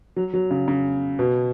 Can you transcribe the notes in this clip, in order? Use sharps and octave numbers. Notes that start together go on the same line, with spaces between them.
F#3
F#3
C#3
C#3
B2